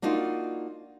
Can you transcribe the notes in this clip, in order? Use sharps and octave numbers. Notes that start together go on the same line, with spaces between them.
A#3 D4 D#4 F4 F#4